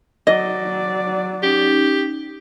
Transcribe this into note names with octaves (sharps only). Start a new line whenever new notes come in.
F#3 D5 D#5
C#4 D#4 G4